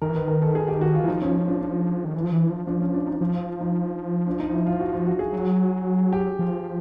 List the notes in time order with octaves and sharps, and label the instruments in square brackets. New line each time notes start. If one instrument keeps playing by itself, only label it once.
[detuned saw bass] D#3 [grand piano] A#4
[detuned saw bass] E3
[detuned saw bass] D#3 [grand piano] B4
[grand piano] A#4
A4
G#4
G4
F#4
F4
[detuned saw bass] E3
[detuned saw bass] F3 [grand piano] D#4
[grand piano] C#4
C#4
D4
D4
[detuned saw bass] D#3
E3
F3
E3
F3
[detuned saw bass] F3 [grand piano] D4
[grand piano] C#4
D4
D#4
[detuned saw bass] F3
[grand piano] F4
D#4
D4
D#4
E4
F4
F#4
F4
F#4
G#4
[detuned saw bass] F#3
[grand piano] G4
[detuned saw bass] F3